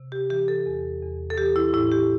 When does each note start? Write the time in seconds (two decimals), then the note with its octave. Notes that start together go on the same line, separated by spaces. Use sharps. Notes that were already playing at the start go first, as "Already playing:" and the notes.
Already playing: C3
0.12 G4
0.30 E3 G4
0.48 A4
0.66 E2
1.02 E2
1.30 A4
1.38 E3 G4
1.56 E4
1.73 A2 E4
1.92 G4